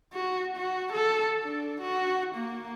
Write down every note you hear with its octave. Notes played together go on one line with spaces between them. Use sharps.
F#4
F#4
A4
D4
F#4
A#3